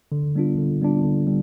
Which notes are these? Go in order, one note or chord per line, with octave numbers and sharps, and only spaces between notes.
D3
G3 B3 D4 F4
D3
G3 B3 D4 F4
D3
G3